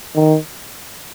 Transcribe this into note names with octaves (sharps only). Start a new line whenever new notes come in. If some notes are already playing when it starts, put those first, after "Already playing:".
D#3